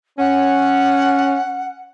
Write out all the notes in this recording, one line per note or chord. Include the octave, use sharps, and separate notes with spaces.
C#4 F#5